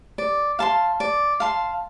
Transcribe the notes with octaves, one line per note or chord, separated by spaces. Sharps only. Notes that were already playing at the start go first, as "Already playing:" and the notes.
D5
F5 A5 C6
D5
F5 A5 C6